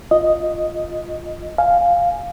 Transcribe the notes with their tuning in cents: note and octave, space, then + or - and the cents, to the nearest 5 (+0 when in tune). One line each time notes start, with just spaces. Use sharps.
F4 +0 D#5 +0
F5 +0 G#5 +0